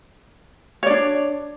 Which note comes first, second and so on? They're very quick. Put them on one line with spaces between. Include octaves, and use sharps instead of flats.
C#5 D5 D4